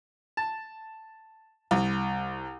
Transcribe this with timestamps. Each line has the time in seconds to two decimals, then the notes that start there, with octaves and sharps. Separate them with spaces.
0.37 A5
1.71 C2